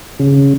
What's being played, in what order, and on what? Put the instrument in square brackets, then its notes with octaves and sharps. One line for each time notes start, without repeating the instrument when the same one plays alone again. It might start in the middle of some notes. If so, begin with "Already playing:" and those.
[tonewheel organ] C#3